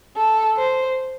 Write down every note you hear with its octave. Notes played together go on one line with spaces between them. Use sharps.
A4
C5